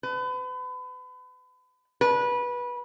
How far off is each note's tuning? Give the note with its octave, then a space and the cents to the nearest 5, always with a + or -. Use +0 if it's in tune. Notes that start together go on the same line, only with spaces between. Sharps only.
B4 +35
B4 -20